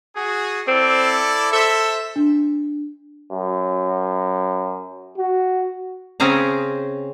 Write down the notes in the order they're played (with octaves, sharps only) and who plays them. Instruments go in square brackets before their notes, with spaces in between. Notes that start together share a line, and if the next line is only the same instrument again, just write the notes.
[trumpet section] F#4 G#4
[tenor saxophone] C4 [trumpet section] E4 A4 D5
[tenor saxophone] A4 [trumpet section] C5 E5
[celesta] D4
[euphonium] F#2
F#4
[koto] C#3 C4 C#4 G#4 C5 A#5